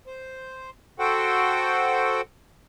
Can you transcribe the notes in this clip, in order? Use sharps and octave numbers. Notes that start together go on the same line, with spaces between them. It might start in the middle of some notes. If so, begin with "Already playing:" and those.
C5
F#4 A4 C5 F#5 G5